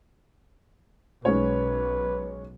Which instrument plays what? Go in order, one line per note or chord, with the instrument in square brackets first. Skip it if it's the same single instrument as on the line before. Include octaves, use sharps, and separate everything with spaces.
[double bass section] B1 [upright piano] G#3 C#4 C#5 [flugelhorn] B4